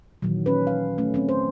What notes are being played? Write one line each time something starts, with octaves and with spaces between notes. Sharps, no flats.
A#2 D#3 E3 F#3
C#4 B4
F5
A3 C#4
F#3 C4 C#4
C5